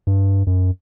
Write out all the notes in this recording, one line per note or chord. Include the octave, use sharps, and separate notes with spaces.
G2
F#2